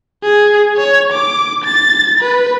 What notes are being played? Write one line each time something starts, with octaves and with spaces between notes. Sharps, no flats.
G#4
C#5
D6
A6
B4